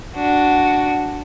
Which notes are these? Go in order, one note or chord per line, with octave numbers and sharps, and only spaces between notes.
D4 F#4